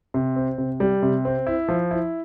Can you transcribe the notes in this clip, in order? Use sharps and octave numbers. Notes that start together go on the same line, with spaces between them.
C3
C4
C3
G3
C3
C4
E4
F3
E4